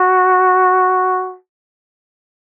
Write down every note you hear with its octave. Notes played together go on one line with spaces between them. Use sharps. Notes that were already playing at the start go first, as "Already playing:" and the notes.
Already playing: F#4